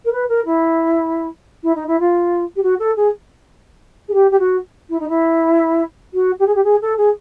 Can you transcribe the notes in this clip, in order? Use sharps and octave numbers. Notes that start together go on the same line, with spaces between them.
A#4
B4
A#4
E4
E4
D#4
E4
F4
G4
F#4
A4
G#4
G#4
G4
G4
F#4
E4
D#4
E4
F#4
G4
G#4
G4
G#4
A4
G#4